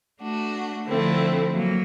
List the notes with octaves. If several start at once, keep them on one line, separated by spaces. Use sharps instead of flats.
A3 D4 F#4
D3 F3 A3 C4 E4
F#3 A#3